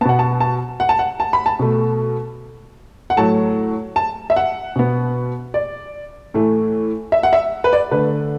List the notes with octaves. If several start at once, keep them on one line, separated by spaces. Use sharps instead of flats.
B2 B3 F#5 A5
A5
A5
F#5
A5
F#5
A5
B5
A5
B2 A3
F#5
A2 F#3 A3 A5
A5
E5
F#5
B2 B3
D5
A2 E3 A3
E5
F#5
E5
B4
D5
D3 A3 B4